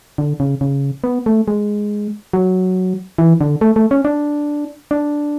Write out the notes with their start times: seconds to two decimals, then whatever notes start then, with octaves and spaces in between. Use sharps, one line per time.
0.18 D3
0.40 C#3
0.61 C#3
1.04 B3
1.26 A3
1.48 G#3
2.33 F#3
3.18 E3
3.41 D3
3.61 A3
3.76 A3
3.91 C#4
4.05 D4
4.91 D4